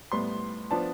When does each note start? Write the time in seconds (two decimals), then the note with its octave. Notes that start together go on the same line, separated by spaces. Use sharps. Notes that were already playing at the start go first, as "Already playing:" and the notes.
0.12 A2 G3 B3 C6
0.71 F3 B3 D4 A5